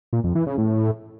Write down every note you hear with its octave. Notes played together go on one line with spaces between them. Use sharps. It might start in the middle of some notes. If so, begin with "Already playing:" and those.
A#2
F2
E3
C#3
A2